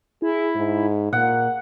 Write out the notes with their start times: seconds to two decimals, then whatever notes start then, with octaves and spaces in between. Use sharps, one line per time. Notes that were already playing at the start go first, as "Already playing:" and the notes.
0.22 E4 G#4
0.55 G#2
1.13 A#2 A#3 F#5